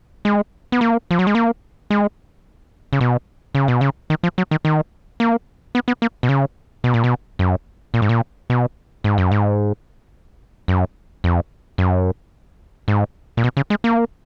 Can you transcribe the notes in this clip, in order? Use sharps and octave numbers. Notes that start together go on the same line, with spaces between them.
G#3
B3
A#3
F3
F#3
G#3
A#3
G#3
C#3
B2
C#3
B2
C#3
D#3
F3
F#3
D#3
D#3
A#3
B3
B3
A#3
B2
C#3
B2
A#2
B2
F#2
A#2
G#2
A#2
B2
G#2
F#2
G#2
F#2
F2
F#2
G#2
A#2
B2
C#3
G#3
A#3